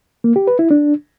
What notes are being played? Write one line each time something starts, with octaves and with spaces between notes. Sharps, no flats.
A#3
G4
B4
E4
D4